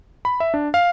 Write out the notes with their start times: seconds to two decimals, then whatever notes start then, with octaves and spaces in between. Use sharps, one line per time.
0.25 B5
0.40 E5
0.54 D4
0.74 F5